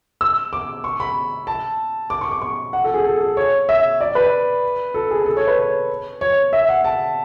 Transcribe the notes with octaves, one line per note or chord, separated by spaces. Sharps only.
E6
D6
C#6
B5
A5
D6
C#6
D6
C#6
F#5
A4
G#4
A4
A4
C#5
E5
D5
B4
A4
G#4
A4
C#5
B4
C#5
C#5
E5
F#5
A5